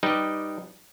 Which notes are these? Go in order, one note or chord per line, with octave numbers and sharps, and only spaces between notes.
G3 D#4 G4 B4 D#5